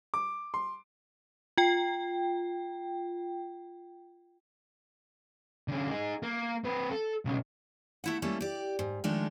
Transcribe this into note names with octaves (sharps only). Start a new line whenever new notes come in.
D6
C6
F4 G5
D3 C#4
D#4 G#4
A#3
C4 B4
A4
B1 C#3
A3 E4 F#5
G3 A3 A#3 C#4 A4
G4 D5
G#2
D#3 F3 G#3 A3 D4 A4